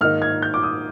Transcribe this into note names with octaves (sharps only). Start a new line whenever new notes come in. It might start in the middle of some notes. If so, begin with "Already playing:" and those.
G#2 D#3 A#3 D#4 F6
G#6
G6
D6
D#6